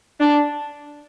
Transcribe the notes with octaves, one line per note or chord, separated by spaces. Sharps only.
D4